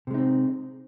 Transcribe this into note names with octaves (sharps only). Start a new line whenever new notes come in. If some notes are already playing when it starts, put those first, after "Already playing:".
C3 G#3 C4 D#4